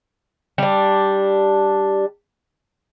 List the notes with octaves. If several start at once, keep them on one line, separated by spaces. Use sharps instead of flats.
G3 D4